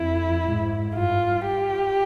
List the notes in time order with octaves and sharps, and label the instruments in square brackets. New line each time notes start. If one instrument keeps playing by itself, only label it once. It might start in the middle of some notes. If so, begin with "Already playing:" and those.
Already playing: [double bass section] F2 [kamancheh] E4
[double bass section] G#2
[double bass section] G2 [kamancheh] F4
[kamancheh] G4